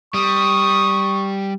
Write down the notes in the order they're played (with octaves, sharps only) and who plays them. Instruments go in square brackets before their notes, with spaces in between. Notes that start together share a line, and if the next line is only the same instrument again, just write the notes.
[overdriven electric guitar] G3 [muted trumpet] C#6 [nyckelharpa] D#6